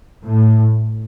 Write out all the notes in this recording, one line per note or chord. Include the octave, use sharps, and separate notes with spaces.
A2